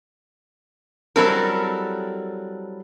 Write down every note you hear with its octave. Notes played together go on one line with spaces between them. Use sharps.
F#3 G3 C4 E4 A4 A#4